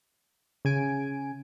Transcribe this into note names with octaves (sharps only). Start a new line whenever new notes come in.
C#3 G#5 D7